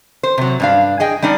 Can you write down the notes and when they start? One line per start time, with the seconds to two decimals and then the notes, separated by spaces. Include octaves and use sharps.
0.23 C5
0.38 C3 F#3
0.60 G2 D4 F5
1.00 G#4 D#5 G5
1.22 G3 D4 D#4 D5